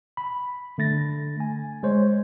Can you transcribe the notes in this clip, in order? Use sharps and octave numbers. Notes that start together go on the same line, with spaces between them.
B5
D3 A3 A6 A#6
G#5
G#3 C5 C#5